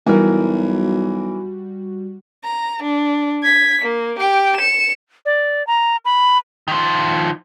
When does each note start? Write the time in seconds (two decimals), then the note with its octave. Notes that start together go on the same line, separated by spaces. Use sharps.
0.06 B1 E3 G3 F#4 A#4
2.44 A#5
2.82 D4
3.43 G#6 B6
3.82 A#3
4.19 G4 G5
4.57 C#7 E7
5.25 D5
5.67 A#5
6.05 B5
6.68 D#3 F3